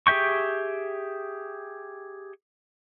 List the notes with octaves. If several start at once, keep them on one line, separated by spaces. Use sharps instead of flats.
G4 G#4 E5 G5 C#6